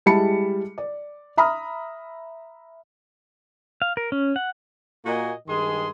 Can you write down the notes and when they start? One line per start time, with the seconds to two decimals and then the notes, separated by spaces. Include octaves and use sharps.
0.06 G3 G#3 E4 A5 B5 C#7
0.78 D5
1.37 E5 A#5 B5 D#6 F6
3.82 F5
3.97 A#4
4.12 C#4
4.36 F#5
5.06 A#2 A#3 F#4 D#5 G#5
5.47 G2 D#3 G#3 G#4 C6